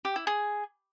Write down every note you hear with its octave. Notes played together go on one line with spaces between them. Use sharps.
G4
E4
G#4